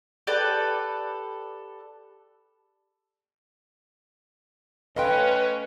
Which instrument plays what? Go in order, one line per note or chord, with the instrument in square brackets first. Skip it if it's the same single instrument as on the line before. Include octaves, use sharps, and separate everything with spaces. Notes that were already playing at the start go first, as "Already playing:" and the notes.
[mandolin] G4 A4 B4 D5
[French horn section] B2 C#4 [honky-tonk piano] A3 F5 C6 [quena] B4 [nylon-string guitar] D#5 G5